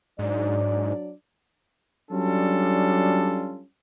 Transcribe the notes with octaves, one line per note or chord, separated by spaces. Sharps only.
G#2 F#3 D4 D5
F#3 G3 C#4 D4 F4 A4